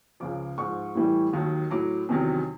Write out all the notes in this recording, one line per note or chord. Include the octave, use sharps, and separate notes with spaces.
C#2 C#3 F3 D6
G#2 F3 C#6
A2 E3 G3
D#2 D#3 F#3
A2 F#3 D6
E2 C3 D#3 F#3